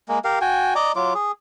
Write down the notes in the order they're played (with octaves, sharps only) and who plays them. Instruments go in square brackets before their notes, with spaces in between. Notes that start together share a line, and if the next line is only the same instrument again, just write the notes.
[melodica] G#3 A#3
G4 A#4 F5
F#4 G5 G#5
D5 D#5 A#5 D6
F#3 F4 D6
G#4